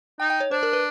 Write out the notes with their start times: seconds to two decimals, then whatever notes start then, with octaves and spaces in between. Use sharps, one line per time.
0.20 D#4 G5
0.30 G5
0.40 C#5
0.51 D4 C5
0.63 A#4
0.73 B4